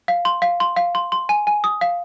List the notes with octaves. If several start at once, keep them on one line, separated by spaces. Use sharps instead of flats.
F5
C6
F5
C6
F5
C6
C6
G#5
G#5
D#6
F5